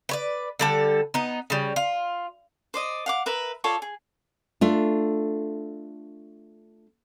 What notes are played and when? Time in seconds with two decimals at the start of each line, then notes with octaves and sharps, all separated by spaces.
0.09 B4 C#5 D5
0.59 D3 G3 A4
1.14 B3 D#4
1.50 C#3 G3
1.76 F4
2.74 C5 D5 D#5
3.06 F5 F#5 D6
3.26 A#4 B4 E5
3.64 F4 A4 C#5 D5
3.82 G#4
4.61 A3 D4 F4